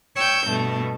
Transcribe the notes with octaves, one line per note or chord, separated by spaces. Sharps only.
C#5 G5 E6 G6
G2 B2 A3